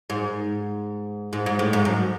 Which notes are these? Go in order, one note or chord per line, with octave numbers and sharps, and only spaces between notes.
G#2
G#2
G#2
A2
G#2
F#2